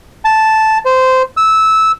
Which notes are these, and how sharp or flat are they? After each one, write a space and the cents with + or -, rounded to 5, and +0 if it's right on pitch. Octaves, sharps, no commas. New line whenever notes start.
A5 -5
C5 -15
E6 -15